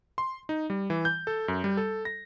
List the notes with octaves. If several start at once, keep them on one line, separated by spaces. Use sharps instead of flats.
C6
D#4
G3
E3
G6
A4
F#2
G3
A4
A#6